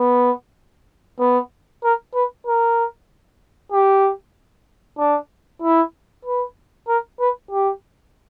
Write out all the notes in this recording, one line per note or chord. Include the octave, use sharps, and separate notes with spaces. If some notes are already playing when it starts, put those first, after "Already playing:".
Already playing: B3
B3
A#4
B4
A#4
G4
D4
E4
B4
A#4
B4
G4